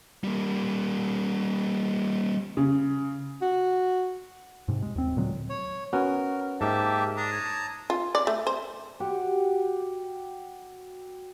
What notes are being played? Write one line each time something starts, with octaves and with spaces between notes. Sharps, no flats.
G3 A#3
C#3
F#4
G#2 C3
G#3
D#2 C4
A#2 D3 F#3 G#3
C#5
B3 C#4 F#4 A#4
G#2 A#3 G4 E5 A5
D4 A5 A#5 D#6
C#5
F4
D5
A3
C5
F#4 G4 F#5